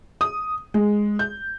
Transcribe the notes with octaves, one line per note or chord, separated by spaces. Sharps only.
D#6
G#3
G6